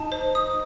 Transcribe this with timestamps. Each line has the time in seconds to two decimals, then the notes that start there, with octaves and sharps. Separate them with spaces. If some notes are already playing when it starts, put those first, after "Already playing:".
Already playing: D#4 A5
0.12 C5
0.35 D#6